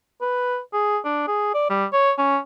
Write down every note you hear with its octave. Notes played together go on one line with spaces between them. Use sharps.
B4
G#4
D4
G#4
D5
G3
C#5
C#4